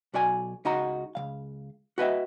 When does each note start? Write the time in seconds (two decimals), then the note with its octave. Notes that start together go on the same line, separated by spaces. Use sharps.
0.14 B1 F#4 D5 G#5
0.65 C#2 D#4 F#4 A#5
1.15 C#2 C3 F5
1.98 F#4 B4 D#5 E5